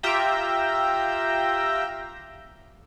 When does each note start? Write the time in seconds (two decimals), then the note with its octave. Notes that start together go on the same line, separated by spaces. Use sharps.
0.03 F4 G4 E5 G5 A#5